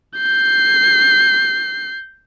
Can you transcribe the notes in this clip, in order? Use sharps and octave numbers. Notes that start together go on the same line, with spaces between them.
G6 C7